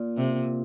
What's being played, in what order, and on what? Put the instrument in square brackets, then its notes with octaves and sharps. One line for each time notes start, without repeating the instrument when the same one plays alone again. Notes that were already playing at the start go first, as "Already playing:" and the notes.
Already playing: [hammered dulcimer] A#2
[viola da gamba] C3